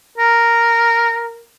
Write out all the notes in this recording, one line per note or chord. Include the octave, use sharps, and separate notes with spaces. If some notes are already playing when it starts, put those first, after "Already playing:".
A#4